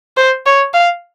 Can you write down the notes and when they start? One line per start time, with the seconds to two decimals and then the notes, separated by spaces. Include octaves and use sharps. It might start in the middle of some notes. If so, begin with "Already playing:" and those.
0.17 C5
0.46 C#5
0.74 F5